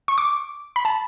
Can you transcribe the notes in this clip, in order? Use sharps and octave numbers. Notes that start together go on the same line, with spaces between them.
C#6
D6
B5
A5